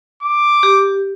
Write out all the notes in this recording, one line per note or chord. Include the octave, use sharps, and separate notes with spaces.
D6
G4